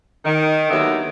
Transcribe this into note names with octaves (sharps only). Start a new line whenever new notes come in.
D#3
D#2 D3 F#3 B3 A#4 E5